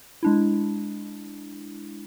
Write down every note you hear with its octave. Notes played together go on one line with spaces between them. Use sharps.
G#3 D4 E4